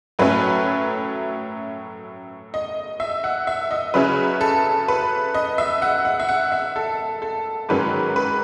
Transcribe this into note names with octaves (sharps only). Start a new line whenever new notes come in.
A2 F#3 A3 C#4 B4
D#5
E5
F#5
E5
D#5
C#3 F#3 C#4 E4 B4
A4
B4
D#5
E5
F#5
F#5
E5
F#5
E5
A4
A4
G#2 D#3 F#3 C#4 B4
B4